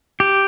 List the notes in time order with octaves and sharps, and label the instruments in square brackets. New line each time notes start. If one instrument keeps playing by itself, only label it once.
[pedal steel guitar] G4